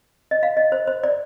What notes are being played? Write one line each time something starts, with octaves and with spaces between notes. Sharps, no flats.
D#5
F5
D#5
C5
C5
D5